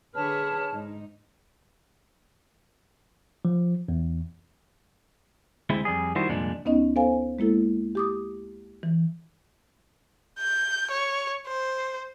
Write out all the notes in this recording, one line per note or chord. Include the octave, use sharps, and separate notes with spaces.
D3 G#4 B4 C#5 A5 F6
G#2 D#4
F3
E2
D2 G#3 C4 E4
F2 G3 G#4
D#3 G3 E4 F#4 C5
C2 F2 A#2 G#3 D4
D2 B3 C#4 D#4 D#5
B3 A4 C5 F5 G#5
G#3 A#3 E4 A4
G4 D6 D#6
E3
G6
C#5
C5